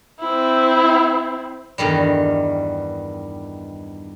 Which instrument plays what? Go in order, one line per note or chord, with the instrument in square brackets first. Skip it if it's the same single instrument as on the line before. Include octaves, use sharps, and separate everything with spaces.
[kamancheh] C4 E4
[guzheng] E2 G2 D#3 G3